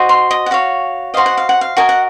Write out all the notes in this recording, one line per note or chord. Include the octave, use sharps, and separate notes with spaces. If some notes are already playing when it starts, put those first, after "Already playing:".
Already playing: F#4 C5 D#5
C6
D#5
F#5
F#4 C#5 F5
F#4 C5 D#5 F5
F#5
F5
F#5
F5
F#4 A#4 D#5 G#5
F#5